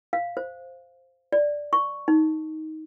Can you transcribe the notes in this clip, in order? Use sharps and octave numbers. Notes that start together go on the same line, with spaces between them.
F5
C5
D5
C#6
D#4